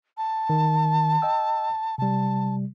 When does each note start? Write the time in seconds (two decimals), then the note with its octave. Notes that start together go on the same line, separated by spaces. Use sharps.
0.17 A5
0.50 D#3
1.22 D#5 G5 E6
1.98 C3 G3 A5